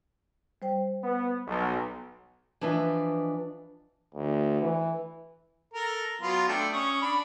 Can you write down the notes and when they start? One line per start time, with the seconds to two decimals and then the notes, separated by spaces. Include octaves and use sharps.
0.62 G3 C5 G5
1.04 B3
1.47 B1
2.61 E3 F3 D4 B4 D#5 E5
4.15 D2
4.62 E3
5.74 A4 A#4
6.22 F#3 B3 F4
6.48 A3 D4 G5
6.73 C#4 C#6 D#6
7.02 D4 B5